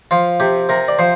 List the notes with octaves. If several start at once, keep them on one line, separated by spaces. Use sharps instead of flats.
F3 F4
C3 G4
C3 A#4
D5
F3 C5